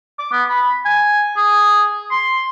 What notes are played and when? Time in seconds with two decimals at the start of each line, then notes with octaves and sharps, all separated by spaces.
0.19 D6
0.32 B3
0.49 B5
0.85 G#5
1.37 G#4
2.11 C6